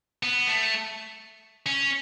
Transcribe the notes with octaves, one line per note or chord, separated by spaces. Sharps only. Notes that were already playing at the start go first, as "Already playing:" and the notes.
B3
A3
C#4